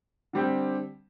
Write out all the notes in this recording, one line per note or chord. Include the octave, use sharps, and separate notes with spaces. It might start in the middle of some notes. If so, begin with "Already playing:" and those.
D3 G3 C4 G4